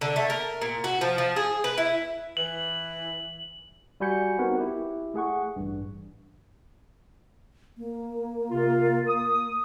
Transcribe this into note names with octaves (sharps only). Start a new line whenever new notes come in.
D3
A3
A#4
A#2
F#4
F3
F3
G#4
B4
E4
E3 F#7
G3 F#4 G#5 B5 G6 C#7
B3 C4 D#4 F#4 A#4 B4
E4 G4
A3 G#4 F#5 C#6
A1 G2
A#3
C3 F4
D#6